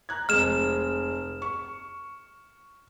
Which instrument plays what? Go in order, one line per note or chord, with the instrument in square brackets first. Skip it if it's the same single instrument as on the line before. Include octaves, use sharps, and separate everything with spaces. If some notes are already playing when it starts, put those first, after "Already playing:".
[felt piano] A#5 F#6 G#6
[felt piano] F1 G#3 [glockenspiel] F6 E7
[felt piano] C#6